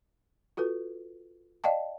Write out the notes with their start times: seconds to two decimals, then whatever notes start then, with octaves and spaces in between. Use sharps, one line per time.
0.57 F4 F#4 A4 B4
1.64 D5 D#5 F5 G5 A5